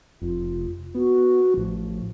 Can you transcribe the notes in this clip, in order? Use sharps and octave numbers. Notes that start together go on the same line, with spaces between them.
F1 F4
B3 F#4
A1 F3